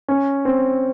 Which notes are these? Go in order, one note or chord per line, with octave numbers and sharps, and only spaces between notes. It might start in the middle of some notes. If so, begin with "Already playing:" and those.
C#4
C4